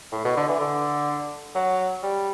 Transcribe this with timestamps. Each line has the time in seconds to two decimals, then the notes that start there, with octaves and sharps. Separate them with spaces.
0.12 A2
0.25 B2
0.37 D3
0.48 E3
0.60 D3
1.55 F#3
2.03 G3